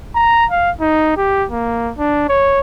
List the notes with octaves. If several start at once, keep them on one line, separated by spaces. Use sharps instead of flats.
A#5
F5
D#4
G4
A#3
D4
C#5